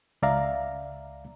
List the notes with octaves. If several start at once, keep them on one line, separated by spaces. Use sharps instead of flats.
C#2 D5 E5 F5 A#5